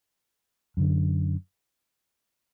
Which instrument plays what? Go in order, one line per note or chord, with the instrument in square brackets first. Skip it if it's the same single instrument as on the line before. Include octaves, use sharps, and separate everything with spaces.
[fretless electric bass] F#2 D3